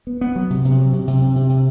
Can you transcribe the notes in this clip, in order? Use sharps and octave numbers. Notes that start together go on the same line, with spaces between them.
B3
B3
F#3
C3
C3
F#3
C3
C3
C3
C3
C3